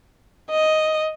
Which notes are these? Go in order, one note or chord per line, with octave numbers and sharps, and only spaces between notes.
D#5